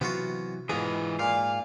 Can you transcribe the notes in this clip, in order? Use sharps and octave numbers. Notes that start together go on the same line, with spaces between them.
C3 E3 F#3 B3 F4 F#4
G#2 E3 B3 F4 G#4 D#5
A#2 F5 G#5